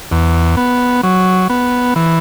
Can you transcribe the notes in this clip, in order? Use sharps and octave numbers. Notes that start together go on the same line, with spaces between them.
E2
B3
F#3
B3
E3